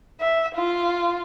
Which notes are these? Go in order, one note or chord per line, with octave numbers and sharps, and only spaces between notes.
E5
F4